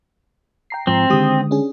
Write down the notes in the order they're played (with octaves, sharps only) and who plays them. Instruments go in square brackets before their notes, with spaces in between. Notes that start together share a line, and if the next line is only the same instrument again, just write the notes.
[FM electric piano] G5 A#5 C7
[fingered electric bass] G#2 F3 [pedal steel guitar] C4
[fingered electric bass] D3 G#3 [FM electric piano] D#3 G4 D#6
[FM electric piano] C#4 D4 G#4